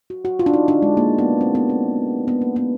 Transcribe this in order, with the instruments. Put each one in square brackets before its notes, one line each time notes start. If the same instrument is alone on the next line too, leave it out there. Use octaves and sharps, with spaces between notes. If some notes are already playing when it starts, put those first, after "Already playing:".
[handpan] F#4
F#4
F4
D4
D#4
D4
G#3
A#3
B3
C4
B3
C4
B3
A#3
B3